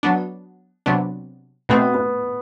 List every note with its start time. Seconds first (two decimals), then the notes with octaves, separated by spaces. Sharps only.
0.03 F#3 B3 D4
0.86 C3 F#3 B3 D4
1.69 B2 A3 B3 C4
1.94 B3